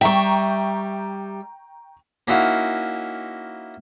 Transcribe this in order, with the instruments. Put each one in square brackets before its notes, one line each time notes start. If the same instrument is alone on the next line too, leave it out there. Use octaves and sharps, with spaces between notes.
[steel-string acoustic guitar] G3 E5 [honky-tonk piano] G5 A#5 C#6
[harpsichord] A#3 C#4 D#4 E4 F#4 F5